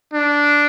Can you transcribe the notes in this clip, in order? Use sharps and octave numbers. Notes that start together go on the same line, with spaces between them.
D4